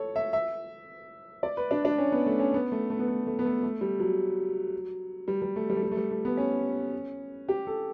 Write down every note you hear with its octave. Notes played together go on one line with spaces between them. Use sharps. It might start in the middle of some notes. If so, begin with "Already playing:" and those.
Already playing: A4 C#5
E5
E5
D5
B4
D4
D4
C#4
B3
A3
C#4
B3
A3
A3
B3
A3
A3
B3
A3
A3
G3
F#3
G3
G3
A3
G3
A3
G3
A3
G3
A3
B3
C#4
G4
A4